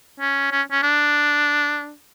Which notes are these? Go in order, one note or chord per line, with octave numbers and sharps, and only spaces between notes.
C#4
C#4
C#4
D4